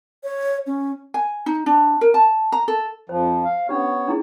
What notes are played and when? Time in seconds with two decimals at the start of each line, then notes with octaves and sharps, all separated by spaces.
0.24 C#5
0.67 C#4
1.14 G#5
1.46 D#4
1.66 D4
2.01 A#4
2.14 A5
2.52 A#5
2.68 A4
3.09 F2 F3 C5
3.45 F5
3.69 B3 C#4 D4 G4 C#5
4.08 D4 E4 G#4